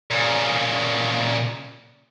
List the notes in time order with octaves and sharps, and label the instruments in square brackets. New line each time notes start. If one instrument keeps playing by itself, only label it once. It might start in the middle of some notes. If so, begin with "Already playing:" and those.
[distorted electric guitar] A#2 C#3